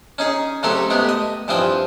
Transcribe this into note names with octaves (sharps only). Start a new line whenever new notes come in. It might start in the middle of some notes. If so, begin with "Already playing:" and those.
C#4 D#4 G#4
C#3 F#3 A3 C4 G4 A4
G#3 A3 B3 G4
D#5
G2 E3 F3 C4 G5 D#6